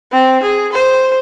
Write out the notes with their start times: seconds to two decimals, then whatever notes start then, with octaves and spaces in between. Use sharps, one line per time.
0.13 C4
0.43 G#4
0.73 C5